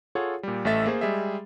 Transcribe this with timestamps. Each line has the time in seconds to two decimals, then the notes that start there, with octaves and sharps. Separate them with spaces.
0.15 F4 G#4 A4 C#5 F#5
0.43 A#2 G3
0.65 A1 A3 A4 E5 A6
0.86 A#3 G#4 C5
1.01 G3 G#3 G#4 E5